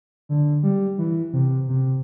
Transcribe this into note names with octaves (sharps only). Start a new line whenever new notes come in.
D3
G3
E3
C3
C3